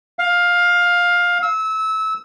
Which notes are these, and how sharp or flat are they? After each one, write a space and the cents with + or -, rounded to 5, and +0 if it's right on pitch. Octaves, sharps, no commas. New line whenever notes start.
F5 +15
E6 -25